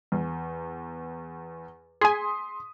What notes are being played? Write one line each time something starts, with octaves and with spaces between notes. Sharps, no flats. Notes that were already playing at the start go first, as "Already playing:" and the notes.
E2
G#4 G#5 C6 D#6 B6